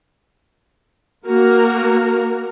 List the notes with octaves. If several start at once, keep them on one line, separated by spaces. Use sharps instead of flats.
A#3 F#4 A#4